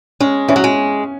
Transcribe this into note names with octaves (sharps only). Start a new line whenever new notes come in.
G#3 C#4
E3 C#4
F#3
G#3